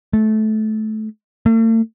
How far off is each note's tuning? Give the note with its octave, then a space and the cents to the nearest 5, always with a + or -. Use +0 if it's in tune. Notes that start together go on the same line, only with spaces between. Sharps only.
A3 -20
A3 +45